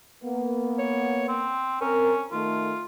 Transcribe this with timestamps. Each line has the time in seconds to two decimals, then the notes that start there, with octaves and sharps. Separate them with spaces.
0.24 A#3 B3
0.79 C#5
1.28 C4
1.81 C4 C#4 A#4
2.32 D#3 A3 F4 A4